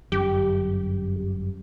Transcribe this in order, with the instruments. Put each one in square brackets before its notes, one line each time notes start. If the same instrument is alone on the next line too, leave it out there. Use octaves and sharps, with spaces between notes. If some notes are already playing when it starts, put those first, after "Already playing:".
[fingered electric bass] G1 F#2 [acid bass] G4